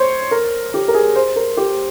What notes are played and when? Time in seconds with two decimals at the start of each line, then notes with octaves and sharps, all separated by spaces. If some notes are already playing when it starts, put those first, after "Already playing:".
Already playing: C5 C#5
0.31 A#4
0.74 G4
0.88 A#4
0.94 G#4
1.16 C5
1.36 A#4
1.57 G4